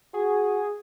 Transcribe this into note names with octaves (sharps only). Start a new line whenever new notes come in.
F#4 G#4